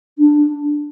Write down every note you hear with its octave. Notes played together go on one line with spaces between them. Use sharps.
D4